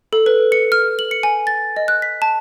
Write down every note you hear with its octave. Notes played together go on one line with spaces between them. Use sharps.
A4
B4
C#7
F6
F#7
C#7
G#5
A6
D#5
F#6
B6
A5